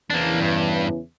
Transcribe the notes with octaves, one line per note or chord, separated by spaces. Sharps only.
E2 C#3 E3 A#3 D4
G2